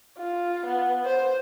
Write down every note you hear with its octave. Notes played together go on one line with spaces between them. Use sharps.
F4
B3
C5